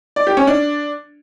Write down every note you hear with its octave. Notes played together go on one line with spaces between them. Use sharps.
D5
G4
C#4
D4